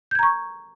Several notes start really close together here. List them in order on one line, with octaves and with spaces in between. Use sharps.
G6 G#6 A#5 C#6